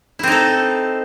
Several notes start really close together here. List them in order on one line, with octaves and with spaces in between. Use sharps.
E4 C4 D#4 A4